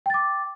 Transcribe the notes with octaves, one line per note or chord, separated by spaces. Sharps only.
G5 D6 A6